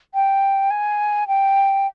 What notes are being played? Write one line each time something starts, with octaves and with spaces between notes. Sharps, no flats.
G5
G#5
G5